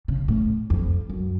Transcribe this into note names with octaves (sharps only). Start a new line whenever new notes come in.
C#3
A2
F2
F#2